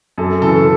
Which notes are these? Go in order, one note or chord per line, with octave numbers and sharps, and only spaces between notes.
F#2 A4
C#3 E3 A4